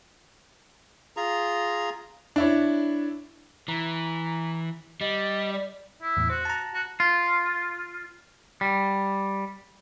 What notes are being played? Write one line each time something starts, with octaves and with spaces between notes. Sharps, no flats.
F4 G#4 A#5
D4 E4 C#5
E3 A#5
G3 D#5
D5
E4
E2 A2
F#4 C5
A5 A#5
F#4
F4
G3